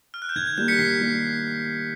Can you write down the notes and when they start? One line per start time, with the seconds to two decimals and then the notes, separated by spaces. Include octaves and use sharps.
0.14 F6
0.22 F#6
0.29 G6
0.35 D#3 G#6
0.47 G#6
0.58 G3 A#3 G6
0.68 B6 C#7
0.78 D#3 C7
1.01 G3 A#3